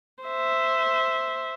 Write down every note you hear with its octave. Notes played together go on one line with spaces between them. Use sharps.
C5 E5